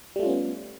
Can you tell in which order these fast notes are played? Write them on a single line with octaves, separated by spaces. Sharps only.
G3 A3 F4 C#4 B3